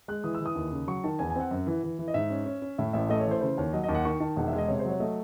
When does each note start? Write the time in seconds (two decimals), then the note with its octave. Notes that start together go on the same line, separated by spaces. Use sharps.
0.08 G#3 F#6
0.24 E3 D#6
0.35 E6
0.41 E3
0.46 D#6
0.55 D#2
0.71 C#3
0.88 F#3 C#6
1.04 D#3 A5
1.19 E2 G#5
1.30 G#5
1.36 C4 F#5
1.51 F#2
1.67 E3
1.83 E3
1.99 E3
2.08 D#5
2.14 G#2 E5
2.30 C#4
2.46 C#4
2.62 C#4
2.78 A2 E5
2.93 A1 E5
3.10 A3 D#5
3.20 C#5
3.26 E3 C5
3.41 C#3 C5
3.57 D#2 C#5
3.73 F#3 D#5
3.84 D#2 D#5
3.95 F#5
4.05 D#3 C#6
4.20 D#3 A5
4.36 E1 F#5
4.48 E5
4.53 G#3
4.58 D#5
4.68 C3 C#5
4.79 C5
4.85 F#3 C#5
5.00 A3 D#5